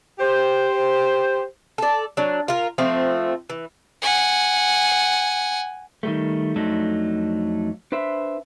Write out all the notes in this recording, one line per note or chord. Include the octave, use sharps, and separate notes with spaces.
G4 C5
A4 D5
F#3 D4
F4 A#4
F3 A3 C4
E3
F#5 G#5
D#3 G3 A3
F2 F#3 A3 D4 D#4
D4 B4 C5 E5